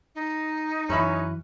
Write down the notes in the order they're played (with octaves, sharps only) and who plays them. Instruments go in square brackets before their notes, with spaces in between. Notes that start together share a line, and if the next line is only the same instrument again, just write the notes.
[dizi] D#4
[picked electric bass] F#2 E3 [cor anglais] C#4 [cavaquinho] B4 E5 B5